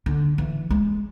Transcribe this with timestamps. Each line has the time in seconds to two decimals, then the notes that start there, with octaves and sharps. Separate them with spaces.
0.06 D3
0.38 E3
0.70 G#3